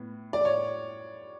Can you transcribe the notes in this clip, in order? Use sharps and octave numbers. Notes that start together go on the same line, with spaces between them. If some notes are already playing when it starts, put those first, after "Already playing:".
Already playing: A2 B3
D5
C#5